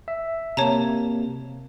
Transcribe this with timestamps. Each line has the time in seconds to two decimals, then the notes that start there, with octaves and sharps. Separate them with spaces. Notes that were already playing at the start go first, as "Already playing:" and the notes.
0.08 E5
0.57 C3 A#3 C#5 A5 A#5